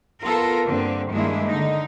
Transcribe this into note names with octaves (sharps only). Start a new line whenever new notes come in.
B3 F4 A4 A#4
G2 D3 A#3 C4
G2 D#3 G#3 A#3 D4 E4
D3 D#4